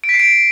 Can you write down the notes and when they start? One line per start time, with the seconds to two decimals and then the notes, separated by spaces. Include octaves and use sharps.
0.04 D7
0.09 B6
0.14 C7
0.20 D7